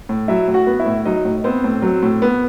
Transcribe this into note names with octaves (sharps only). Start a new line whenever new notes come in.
A2
F#3 E4 E5
A2
F#4 F#5
B3
E4 E5
A2
F#3 D#4 D#5
A2
B3 C4 C5
A2
F#3
A2
B3